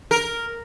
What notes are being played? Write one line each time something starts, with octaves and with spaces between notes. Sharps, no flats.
A#4